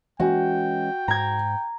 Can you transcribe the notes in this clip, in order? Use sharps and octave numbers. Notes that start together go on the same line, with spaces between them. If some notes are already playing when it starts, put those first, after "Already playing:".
E3 G#3 C#4 F#4 G5
G#2 A#5 G#6